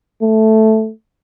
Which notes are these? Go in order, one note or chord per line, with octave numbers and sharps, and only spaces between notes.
A3